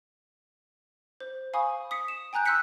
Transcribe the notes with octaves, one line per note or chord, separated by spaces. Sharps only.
C5
F5 G#5 B5 C#6 D#6
D#6 B6 C#7
E7
G5 G#5 A#5 F#6 G6
C6 E6 F#6 G6 B6 C#7